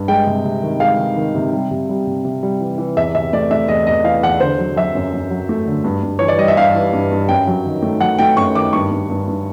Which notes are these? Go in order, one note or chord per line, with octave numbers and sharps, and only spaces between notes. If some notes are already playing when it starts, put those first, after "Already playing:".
Already playing: G2
G#3 G5
C3
C3
D#3
G#3 F5
D#3
D#3
C3
G3
C3
G3
C3
C3
G3
E3
E3
E2 E5
C3 E5
A3 D5
A3 E5
E2 D#5
E2 D#5
E3 F5
E2 F#5
D3 C5
F#3
F#3 E5
F#2
F#2
F#3
A3
D3
G2
G2
E3 C#5
D5
G3 D#5
E5
G2 F5
E3
G2
G2
F#2 G5
F#3
D#3
A3
F#3 F#5
A3 G5
F#2 C#6
D#3 D6
G2 C#6
G2
G2
G2